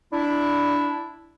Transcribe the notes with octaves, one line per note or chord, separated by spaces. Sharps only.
D4 E4